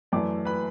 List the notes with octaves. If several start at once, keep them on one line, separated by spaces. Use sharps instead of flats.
F#2 E3 A3 D5 D6
B4 B5